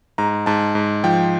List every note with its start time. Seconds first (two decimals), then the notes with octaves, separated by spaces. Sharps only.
0.18 G#2 A#5
0.46 G#2 A5
0.75 G#2
1.04 F3 G5